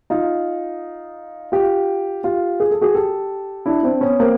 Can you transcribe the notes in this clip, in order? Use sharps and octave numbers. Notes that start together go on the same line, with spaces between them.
D#4 F4
F4 G4
F4 G4
G#4
A4
F#4 G#4
G4 A4
D4 E4
C4 D4
B3 C#4
A#3 C4